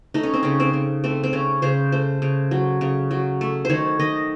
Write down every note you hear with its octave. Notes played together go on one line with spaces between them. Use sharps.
A3 D#4
C#4
C4
C#3 C#4
C4
C#3
A3 C4
C4
C#3 C#4
C#3 C5
A3 C5
C#3
F#3
C#3
F#3
A3
D#3 C5 C#5
D#3 D#5